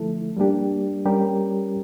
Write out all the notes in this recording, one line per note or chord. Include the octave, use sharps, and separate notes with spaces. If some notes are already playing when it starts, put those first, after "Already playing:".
Already playing: D3 F3 A3 E4 A4
G3 A#3 D4 G4
G3 C#4 G4 A#4